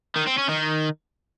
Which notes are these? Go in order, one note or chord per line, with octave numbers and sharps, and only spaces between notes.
D#3
C4
C#4
D#3